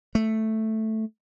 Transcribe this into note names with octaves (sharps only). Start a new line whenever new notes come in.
A3